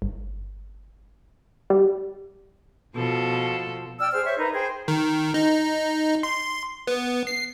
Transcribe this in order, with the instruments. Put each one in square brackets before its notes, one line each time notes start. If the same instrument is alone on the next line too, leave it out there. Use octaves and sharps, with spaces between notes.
[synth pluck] G1
[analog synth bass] G3
[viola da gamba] B2 F3 A4
[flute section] D5 G5 E6 F6
G#4 C5 F6
C5 C#5 E5
D#4 A#4 B4
G#4 C5 G5
[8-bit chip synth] D#3
D#4
C6
B3
C7